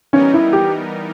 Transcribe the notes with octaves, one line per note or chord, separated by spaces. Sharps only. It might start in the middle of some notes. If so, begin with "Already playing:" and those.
E3 G3 B3 C#4 D#4 A#4
E4
G4